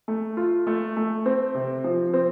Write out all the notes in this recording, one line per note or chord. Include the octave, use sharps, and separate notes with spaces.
A3
F4
A3
A3
C4
C3
F3
C4